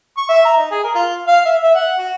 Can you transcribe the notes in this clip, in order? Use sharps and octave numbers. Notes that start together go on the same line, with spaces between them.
C#6
E5
A#5
D#4
G#4
A#4
F4
F5
E5
E5
F#5
F#4